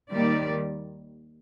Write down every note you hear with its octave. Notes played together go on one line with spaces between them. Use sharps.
D#2 D#3 G3 A#3 D5